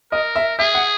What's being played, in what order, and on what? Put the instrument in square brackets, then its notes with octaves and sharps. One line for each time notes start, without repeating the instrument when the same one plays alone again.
[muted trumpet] A#4 [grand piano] D#5
[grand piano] E5
[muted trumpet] G#4 [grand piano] E5
[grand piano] F#5